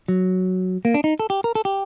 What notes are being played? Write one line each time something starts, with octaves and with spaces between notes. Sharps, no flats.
F#3
A#3
D4
D#4
A4
G4
A#4
A4
G4